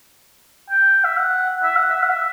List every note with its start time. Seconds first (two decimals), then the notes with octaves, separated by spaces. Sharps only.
0.70 G5
1.04 E5
1.17 F#5
1.63 E5
1.77 F#5
1.90 E5
2.03 F#5
2.10 E5